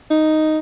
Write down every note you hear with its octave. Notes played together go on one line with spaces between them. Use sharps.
D#4